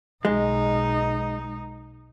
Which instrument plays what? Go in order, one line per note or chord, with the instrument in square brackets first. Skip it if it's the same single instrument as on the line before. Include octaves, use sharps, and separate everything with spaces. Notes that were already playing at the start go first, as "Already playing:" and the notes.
[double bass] B1 D#4 [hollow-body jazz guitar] G#3